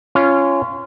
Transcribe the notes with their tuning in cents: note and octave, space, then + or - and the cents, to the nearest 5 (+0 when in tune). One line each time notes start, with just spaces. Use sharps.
C#4 +0 F4 -25